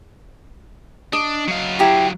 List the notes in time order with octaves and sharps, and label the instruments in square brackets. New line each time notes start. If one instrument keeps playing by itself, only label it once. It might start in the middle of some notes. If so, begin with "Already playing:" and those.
[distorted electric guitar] D4 [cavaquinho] D#5
[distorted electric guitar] F#3 F5
[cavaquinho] E4 G4 A#5